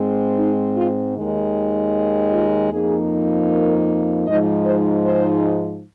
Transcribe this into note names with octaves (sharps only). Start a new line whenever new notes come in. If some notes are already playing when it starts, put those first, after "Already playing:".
Already playing: G#2 G#3 C4
D#4
F4
D#2 D#3 G#3
F4
F2 F3 A#3 D#4 G#4
A#4
G#2 F3 G#3 D#4 D#5
C5
C5